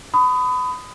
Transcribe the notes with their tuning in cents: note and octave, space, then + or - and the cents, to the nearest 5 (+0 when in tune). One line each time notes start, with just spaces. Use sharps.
B5 +30 D#6 +0